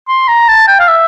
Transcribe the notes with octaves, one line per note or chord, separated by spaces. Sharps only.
C6
A#5
A5
G5
F5
E5